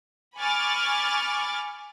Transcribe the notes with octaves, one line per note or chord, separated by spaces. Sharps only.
G#5 B5 C#6 D6 F6 A6